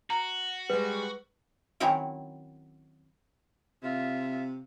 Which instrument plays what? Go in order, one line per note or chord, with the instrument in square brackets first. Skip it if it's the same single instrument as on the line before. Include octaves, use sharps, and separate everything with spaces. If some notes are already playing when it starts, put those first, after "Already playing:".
[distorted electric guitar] F#4 [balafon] A#5
[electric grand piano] G3 G#3 [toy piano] B4
[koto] D#3 F#3 C4 C#4 E4 A#4
[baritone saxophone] C3 [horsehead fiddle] F4 E5